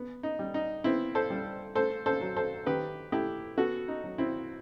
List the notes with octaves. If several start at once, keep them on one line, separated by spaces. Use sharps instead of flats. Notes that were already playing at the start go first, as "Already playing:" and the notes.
Already playing: B3
D#4
G3
D#4
B3 C4 E4
A4 C5
G3
A3 A4 C5
A4 C5
F#3
A4 C5
D#3 G4 B4
A3 E4 G4
B3 F#4 A4
D#4
F#3
C4 E4